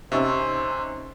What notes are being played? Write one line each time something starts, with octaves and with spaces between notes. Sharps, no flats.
C3 C#4 D#4 C5 E5 C#6 E6